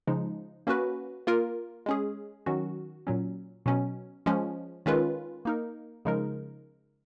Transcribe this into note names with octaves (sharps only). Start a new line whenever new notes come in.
C#3 F3 G#3 D#4
A#3 C#4 F#4 B4
A#3 F4 A#4
G#3 C#4 G#4
D#3 F#3 C#4 F#4
A#2 F#3 C#4
B2 F#3 C#4
F3 G#3 C#4
D#3 G#3 C#4 F4 B4
A#3 D#4 A#4
C#3 F3 G#3 D#4 A#4